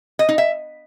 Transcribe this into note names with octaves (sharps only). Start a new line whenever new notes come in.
D#5
D#4
E5